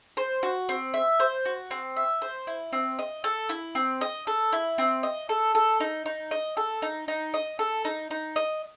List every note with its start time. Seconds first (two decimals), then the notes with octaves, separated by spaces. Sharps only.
0.17 C5
0.43 F#4
0.69 C4
0.94 E5
1.20 C5
1.45 F#4
1.71 C4
1.97 E5
2.22 C5
2.47 E4
2.73 C4
2.99 D#5
3.24 A4
3.49 E4
3.75 C4
4.01 D#5
4.27 A4
4.53 E4
4.78 C4
5.03 D#5
5.29 A4
5.55 A4
5.80 D#4
6.06 D#4
6.31 D#5
6.57 A4
6.82 D#4
7.08 D#4
7.34 D#5
7.59 A4
7.85 D#4
8.11 D#4
8.36 D#5